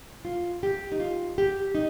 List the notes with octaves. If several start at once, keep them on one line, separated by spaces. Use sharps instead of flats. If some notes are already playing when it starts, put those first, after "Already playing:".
F4
G4
D#4
F4
G4
D#4